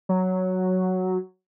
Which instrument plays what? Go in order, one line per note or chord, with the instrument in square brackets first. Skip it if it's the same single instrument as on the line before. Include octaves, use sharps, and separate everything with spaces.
[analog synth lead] F#3